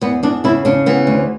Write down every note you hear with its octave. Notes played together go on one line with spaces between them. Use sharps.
E2 B3
E2 D4
C#3 E4
C#3 D4
E3 B3
D2